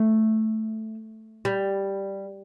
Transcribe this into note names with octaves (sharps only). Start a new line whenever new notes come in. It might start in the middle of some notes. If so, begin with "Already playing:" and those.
Already playing: A3
G3